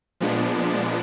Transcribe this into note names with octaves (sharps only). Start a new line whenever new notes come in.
A#2 F3 G#3 B3 D4